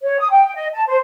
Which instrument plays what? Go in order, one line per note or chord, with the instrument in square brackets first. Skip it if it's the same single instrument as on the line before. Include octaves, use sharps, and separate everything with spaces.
[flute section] C#5
D#6
G5
D#5
A5
C5